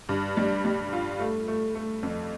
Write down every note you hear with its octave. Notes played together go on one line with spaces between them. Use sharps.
G2
G3
G3
F4
A3
A3
A3
F2